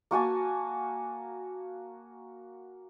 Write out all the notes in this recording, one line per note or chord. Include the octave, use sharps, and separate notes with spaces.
A#3 F#4 G#5 A5